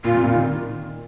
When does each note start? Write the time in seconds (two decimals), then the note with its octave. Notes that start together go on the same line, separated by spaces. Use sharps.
0.04 A#2 F4
0.15 C3
0.24 A#2
0.34 D#3